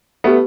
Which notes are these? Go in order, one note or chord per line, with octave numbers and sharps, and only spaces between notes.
A3 B3 E4 G4 B4